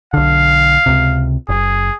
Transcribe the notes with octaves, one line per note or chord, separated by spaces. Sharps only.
B1 D3 F5
C#2 C3
F#1 G#4